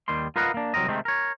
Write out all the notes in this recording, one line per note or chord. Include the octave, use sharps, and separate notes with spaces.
D#2 D#3 G3 C6
F4 A#4 B4 D#5 F5 F#5
A#3 D4
C2 F#3 C4 A#4 D#5
C3 D#3 G#3 A3 C4
A#4 C#5